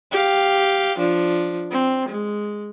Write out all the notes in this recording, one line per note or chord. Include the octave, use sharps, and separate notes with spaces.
G4 F5
F3 D4
C4
G#3